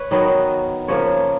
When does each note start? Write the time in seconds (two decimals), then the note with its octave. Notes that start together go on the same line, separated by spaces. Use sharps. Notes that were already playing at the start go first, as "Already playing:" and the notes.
Already playing: B4 C#5
0.11 D#3 F#3 B3 D#5
0.88 C#3 F3 A#3 C#5